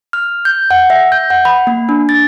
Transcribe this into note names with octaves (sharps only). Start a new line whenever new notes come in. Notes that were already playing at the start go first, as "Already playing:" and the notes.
F6
G6
F#5
E5
G6
F#5
B5
A#3
D4
A6